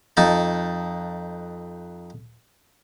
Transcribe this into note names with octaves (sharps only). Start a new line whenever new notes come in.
F2 D#4 A5